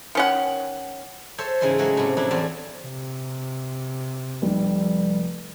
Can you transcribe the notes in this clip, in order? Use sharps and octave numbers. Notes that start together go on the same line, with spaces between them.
D#3 C#4 F#5
A4 C5 C#5 E5
G#2 C#3 E3 G#3 E4 C6
F#3 G#3 A3 F#4 F5
A2 C3
F2 F#3 A3 D4 E4
E2 C4 G#5 A5
C3
F1 G3